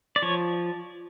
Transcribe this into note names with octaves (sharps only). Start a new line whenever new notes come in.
D5
F3 C#5